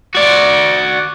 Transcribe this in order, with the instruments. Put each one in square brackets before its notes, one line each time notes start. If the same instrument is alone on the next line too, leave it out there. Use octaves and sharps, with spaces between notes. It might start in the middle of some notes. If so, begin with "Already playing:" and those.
[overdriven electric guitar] F#4 D5